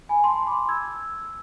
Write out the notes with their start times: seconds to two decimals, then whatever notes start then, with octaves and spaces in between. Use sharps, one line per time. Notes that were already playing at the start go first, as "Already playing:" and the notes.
0.09 G#5 B5
0.24 A5 C6
0.47 B5 D6
0.69 E6 G#6